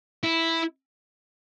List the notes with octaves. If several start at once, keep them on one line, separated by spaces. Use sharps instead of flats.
E4